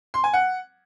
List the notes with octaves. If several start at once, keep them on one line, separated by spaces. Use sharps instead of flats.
C6
G#5
F#5